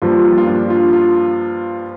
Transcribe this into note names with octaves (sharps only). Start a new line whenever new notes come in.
G2 F3 A#3 F4
F4
F4
D4
F4
F4